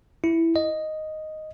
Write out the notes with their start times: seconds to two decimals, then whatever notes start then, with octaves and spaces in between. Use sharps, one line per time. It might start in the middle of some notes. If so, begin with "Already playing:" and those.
0.24 E4
0.56 D#5